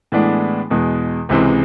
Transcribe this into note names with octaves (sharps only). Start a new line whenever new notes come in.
A2 E3 G#3 B3 D4
E2 B2 G#3
C#2 C3 E3 G#3 C4